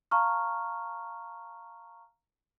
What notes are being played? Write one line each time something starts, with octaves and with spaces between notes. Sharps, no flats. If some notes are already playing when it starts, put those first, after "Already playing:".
F5 A5 A#5 C#6 F6